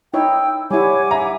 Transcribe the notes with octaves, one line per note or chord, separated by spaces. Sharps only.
D#4 E4 C#5 G5 E6
G3 E4 C#5 F#5 G#5 D6
E5 A#5